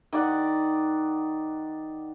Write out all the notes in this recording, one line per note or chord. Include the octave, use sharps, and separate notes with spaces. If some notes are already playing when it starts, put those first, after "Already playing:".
D#3 D5 F#5